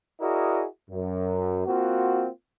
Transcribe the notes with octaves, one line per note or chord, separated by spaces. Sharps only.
E4 F#4 G#4 A#4 D5 D#5
F#2
A#3 C4 F4 F#4